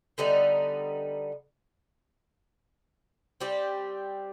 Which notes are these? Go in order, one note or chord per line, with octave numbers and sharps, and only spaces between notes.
D3 G3 B3 D#4
G3 C4 G4